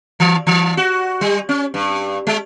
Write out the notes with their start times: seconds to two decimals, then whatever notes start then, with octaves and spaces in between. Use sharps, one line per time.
0.20 E3
0.47 E3
0.77 F#4
1.21 G3
1.49 C#4
1.74 G2
2.27 G#3